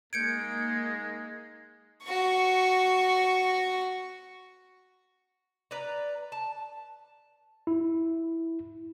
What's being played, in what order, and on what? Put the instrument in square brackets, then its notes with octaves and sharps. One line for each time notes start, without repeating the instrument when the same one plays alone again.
[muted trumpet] G#3 [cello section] A#3 D#4 [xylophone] G6 C#7 D7 [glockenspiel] G#6
[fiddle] F#4 C#6
[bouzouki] B4 D5 A#5
A5
[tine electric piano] E4